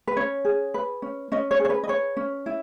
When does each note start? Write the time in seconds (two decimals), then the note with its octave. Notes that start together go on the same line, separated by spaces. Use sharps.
0.07 B4
0.17 C#4 C#5
0.45 G#4
0.74 B4
1.02 C#4
1.32 C#4 D#5
1.51 C#5
1.60 G#4
1.65 C#5
1.70 B4
1.83 D#5
1.88 B4 C#5
2.17 C#4
2.46 E4